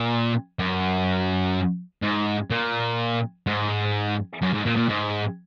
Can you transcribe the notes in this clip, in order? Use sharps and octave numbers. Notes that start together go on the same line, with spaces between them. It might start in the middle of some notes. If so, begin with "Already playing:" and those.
Already playing: A#2
F#2
G#2
A#2
G#2
F#2
G#2
A#2
A#2
G#2